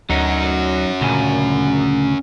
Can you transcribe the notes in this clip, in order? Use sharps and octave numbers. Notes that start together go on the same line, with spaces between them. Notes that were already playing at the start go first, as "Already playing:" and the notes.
D2 F#3 C#4 D#4 F#4
D2 A#2 C#3 G#5